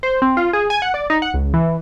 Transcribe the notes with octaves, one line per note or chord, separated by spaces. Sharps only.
C5
C4
F4
G#4
G#5
F#5
D5
D#4
F#5
C#2
E3